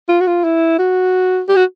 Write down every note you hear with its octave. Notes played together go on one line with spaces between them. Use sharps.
F4
F#4
F4
E4
F#4
G4
F#4